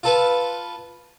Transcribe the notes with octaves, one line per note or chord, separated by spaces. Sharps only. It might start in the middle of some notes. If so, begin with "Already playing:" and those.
F4 A4 B4